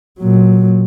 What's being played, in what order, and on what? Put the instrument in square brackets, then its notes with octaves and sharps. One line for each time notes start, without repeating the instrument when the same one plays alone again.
[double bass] A#2 F#3